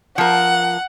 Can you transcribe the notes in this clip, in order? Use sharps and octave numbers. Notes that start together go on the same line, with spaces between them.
F3 A#4 F#5